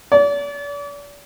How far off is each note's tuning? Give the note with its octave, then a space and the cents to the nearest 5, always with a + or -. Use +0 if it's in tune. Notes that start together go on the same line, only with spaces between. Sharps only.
D5 -40